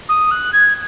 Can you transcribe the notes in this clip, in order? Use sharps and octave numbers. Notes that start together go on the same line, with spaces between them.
D#6
F#6
G#6